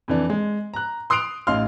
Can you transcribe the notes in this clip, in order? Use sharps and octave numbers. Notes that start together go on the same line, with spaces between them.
F2 E3 D4
G#3
A#5 F#6
C6 D#6 F#6 C7 D7 F7
A1 D#4 F5 C6 F6